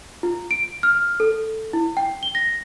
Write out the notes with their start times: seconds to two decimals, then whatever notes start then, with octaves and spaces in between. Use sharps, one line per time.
0.23 F4
0.51 D7
0.83 F6
1.20 A4
1.73 E4
1.97 G5
2.23 G7
2.35 A#6